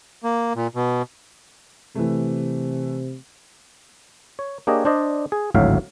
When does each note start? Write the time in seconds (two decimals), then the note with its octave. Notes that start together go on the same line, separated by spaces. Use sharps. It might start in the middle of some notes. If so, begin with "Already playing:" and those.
0.24 A#3
0.55 A#2
0.75 B2
1.95 C3 E3 A3
4.39 C#5
4.67 A#3 D4 G4 G#4 C#5 D#5
4.85 D4 C5 D5 D#5
5.32 G#4
5.54 G#1 D2 A2 F#3 E5 F5